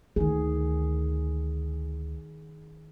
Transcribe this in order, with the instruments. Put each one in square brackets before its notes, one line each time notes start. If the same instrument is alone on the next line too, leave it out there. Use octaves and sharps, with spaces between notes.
[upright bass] D2 [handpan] D#3 G#4